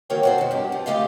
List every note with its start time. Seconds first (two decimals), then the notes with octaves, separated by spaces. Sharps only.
0.10 D#3 F#3 A#3 A#4 C#5 G5
0.23 B2 F#4 C5
0.38 F2 G#2
0.51 G2 G4
0.72 F3
0.86 G#3 A3 G4 D#5 F5